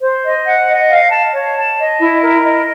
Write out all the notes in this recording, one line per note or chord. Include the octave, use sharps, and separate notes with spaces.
C5
D#5
F#5
D#5
F5
A5
C#5
A5
D#5
E4
A#4
D#5